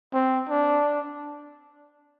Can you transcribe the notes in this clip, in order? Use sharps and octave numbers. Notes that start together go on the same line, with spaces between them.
C4
D4